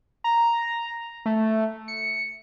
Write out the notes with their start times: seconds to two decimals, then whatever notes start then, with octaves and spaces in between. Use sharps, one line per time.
0.24 A#5
1.26 A3
1.88 C#7